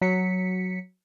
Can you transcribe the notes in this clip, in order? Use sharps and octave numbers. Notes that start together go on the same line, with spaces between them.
F#3 B6 C#7